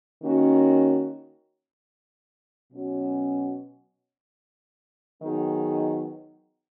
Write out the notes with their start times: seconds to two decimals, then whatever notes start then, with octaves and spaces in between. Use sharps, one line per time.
0.21 D#3 A#3 C#4 F#4
2.73 B2 F#3 C#4 F#4
5.23 D#3 F#3 B3 D#4 G#4